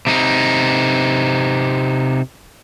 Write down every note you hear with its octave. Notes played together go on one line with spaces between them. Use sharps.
C3 D#4